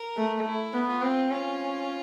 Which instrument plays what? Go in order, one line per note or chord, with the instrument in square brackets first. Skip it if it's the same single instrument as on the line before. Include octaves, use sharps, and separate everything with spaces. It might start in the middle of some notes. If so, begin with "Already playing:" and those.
Already playing: [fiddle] A#4
[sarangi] A3
[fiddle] E4
[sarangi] B3
[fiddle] F4
[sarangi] C4
[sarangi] C#4 [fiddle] F4